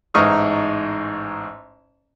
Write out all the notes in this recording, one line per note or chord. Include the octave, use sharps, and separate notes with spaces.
A1 G#2 D#4 C#6 D#6 F6